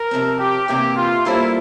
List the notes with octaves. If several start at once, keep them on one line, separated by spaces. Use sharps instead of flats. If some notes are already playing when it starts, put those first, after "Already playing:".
Already playing: A#4
C3 F3 C4
G4
C3 E3 A#3 E4 G4
F4
G3 A#3 E4 F4 A4 C5